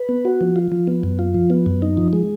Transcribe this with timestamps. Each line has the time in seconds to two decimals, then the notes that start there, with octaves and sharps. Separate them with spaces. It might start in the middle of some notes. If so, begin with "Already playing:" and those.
Already playing: B4
0.09 B3
0.25 F#4
0.41 F3
0.56 F4
0.72 F3
0.87 B3
1.03 F#2
1.19 F4
1.34 F3
1.50 B3
1.66 F#2
1.82 D#4
1.97 F3
2.13 G#3